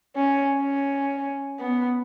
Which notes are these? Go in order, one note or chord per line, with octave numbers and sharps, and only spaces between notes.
C#4
C#4
B3